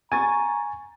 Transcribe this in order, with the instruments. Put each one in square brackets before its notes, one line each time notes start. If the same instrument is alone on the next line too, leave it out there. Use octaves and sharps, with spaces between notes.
[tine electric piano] G#5 [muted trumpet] A#5 [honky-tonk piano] C#6 A6